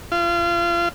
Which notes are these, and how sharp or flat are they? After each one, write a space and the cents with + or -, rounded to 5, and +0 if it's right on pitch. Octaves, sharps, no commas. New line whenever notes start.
F4 -30